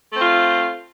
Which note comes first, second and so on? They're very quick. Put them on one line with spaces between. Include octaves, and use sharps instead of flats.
A3 C4 F4